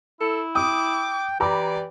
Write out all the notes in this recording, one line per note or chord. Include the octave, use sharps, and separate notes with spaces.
E4 A4
G5 D6 D#6
E3 G4 D5 A#5 B5 D6